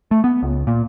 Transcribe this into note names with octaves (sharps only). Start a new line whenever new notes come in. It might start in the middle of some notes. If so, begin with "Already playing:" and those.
A3
B3
C#2
A#2